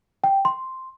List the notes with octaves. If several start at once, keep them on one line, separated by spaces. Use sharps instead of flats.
G5
C6